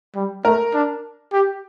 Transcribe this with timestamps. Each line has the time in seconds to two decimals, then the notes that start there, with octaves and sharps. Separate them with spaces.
0.15 G3
0.45 A3 A#4
0.74 D4
1.33 G4